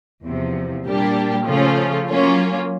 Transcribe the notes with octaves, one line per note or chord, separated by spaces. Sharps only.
E2 C3 F3
A#2 G3 A#3 D4 G4
C#3 F3 A3 C#4 F4
F#3 A#3 C#4 F4